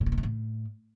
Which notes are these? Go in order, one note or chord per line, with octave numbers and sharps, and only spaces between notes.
A2
A#2
B2
A#2
A2